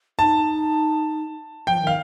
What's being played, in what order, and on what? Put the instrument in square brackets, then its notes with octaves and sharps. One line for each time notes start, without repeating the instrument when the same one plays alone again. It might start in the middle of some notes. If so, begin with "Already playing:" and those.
[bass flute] D#4 [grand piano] A5
[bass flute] F3 [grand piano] G5
[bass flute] D#3
[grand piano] F5